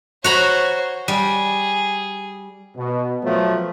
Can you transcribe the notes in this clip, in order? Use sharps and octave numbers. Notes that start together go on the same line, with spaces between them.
F#4 C5 C#5 A#5 B5
G3 G#4
B2
F3 F#3 A3 B3